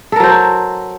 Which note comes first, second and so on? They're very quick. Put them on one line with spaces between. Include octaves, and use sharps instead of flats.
A4 A#4 F#3 C5